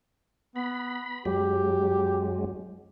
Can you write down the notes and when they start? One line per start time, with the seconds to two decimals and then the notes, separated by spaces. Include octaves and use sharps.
0.56 B3 B5
1.25 F#2 F#3 G#3 G4